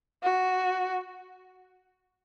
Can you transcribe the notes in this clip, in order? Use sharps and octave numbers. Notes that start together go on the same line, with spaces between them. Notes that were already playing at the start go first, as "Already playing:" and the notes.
F#4